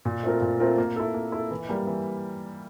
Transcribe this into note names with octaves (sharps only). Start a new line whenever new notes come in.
A#2
A3 C4 F4 A#4
A#2
A3 C4 F4 A#4
A#3
E4 A4
A#3
E4 A4
E3
G3 A#3
E3